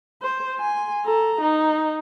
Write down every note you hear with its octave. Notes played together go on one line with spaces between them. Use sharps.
C5
G#5 C6
A4 A#5
D#4